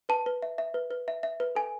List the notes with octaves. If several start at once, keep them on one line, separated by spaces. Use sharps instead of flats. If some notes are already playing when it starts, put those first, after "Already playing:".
B4 A5
B4
E5
E5
B4
B4
E5
E5
B4
A4 G#5